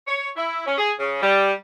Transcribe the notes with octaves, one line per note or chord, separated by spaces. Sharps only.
C#5
E4
C#4
G#4
C#3
G3